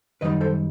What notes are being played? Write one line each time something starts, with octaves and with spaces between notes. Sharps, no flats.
F#2 D#3 G3 D#4 B4 D#5
A4 C5